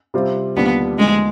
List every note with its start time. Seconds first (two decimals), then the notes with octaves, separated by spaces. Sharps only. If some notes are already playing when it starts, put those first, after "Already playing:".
0.14 C3 G3 C4 F4
0.56 D#2 D3 G3 B3 D4 F4
0.98 D#2 D3 F3 G#3